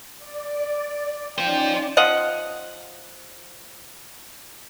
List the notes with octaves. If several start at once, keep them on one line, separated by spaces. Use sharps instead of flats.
D5
C#4 D#4 F4 C5 D5 G5
F3 D#5 F5 F#5